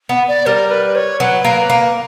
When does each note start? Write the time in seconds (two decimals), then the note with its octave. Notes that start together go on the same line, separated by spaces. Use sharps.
0.09 B3
0.28 D5
0.46 G3 A#4
0.71 B4
0.95 C#5
1.20 F#3 B4
1.45 A#3
1.70 A#3